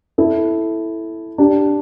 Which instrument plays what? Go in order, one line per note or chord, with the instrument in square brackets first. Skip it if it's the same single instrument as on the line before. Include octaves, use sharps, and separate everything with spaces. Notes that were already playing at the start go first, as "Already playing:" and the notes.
[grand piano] E4 A4
D4 G4